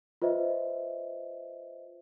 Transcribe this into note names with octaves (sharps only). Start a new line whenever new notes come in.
F4 B4 C5 D#5 E5